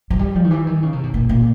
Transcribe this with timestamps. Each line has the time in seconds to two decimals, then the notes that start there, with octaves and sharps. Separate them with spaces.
0.10 F#3
0.19 G3
0.35 F3
0.44 D#3
0.51 E3
0.67 D#3
0.83 C#3
0.93 C3
1.03 B2
1.14 A#2
1.29 A#2